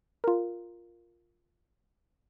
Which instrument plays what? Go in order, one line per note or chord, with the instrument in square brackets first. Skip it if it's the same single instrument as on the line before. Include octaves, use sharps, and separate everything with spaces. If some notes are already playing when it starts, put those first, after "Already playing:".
[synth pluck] F4 A#4